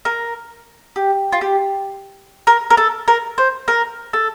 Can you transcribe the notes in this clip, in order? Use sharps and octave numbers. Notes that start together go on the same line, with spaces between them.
A#4
G4
F4
G4
A#4
A#4
A4
A#4
C5
A#4
A4